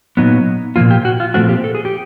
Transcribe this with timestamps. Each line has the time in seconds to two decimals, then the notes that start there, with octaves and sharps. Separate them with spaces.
0.17 A#2 F#3 B3 D#4
0.76 A#2 F3 A#3 F4
0.91 G4
1.05 F#4
1.20 F4
1.34 A#2 F3 A3 C4 F#4
1.49 G4
1.64 A4
1.75 G#4
1.85 G4